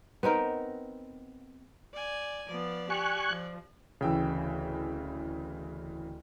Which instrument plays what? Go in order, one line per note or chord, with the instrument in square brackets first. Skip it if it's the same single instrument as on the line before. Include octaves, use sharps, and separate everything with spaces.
[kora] B3 C4 D#4 A#4
[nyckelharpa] D5 G#5
[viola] F3 B3 [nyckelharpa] D5
[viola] G4 [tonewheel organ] G#5 C#6 F#6
[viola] F3
[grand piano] D1 G5 E6 [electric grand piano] C#3 E3